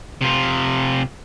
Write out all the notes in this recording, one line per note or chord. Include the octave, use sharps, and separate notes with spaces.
C3 F4